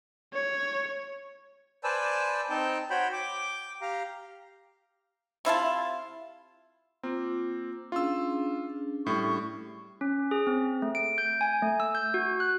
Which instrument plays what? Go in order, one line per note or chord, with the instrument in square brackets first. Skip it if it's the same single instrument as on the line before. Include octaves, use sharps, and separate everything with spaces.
[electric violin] C#5
[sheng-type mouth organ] B4 C5 D5 G#5 A5 E6
C4 D#4 G5 A5
F#4 C5 C#5 G5 B5
G5 D6
G4 F5 A#5
[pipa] C3 E4 F4 A5
[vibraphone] A#3 F4 D6 [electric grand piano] C4
[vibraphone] C#4 D4 G#4 [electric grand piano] F4 E6
[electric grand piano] A2 G3 [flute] C#6
[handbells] C#4
G#4
C4
A3
D7
G6
G#5
A3
E6
G6
F#4
F#6